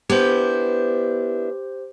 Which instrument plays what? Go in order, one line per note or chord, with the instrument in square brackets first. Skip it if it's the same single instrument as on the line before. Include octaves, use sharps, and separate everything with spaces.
[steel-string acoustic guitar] B3 D4 E4 [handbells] G4 C5